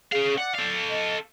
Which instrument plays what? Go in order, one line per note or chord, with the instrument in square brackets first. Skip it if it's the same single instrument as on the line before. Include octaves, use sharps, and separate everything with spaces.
[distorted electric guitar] C#4 F5 [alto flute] G#4
[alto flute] D5 [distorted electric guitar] F#5
[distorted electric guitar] A4 F5
[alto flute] D#5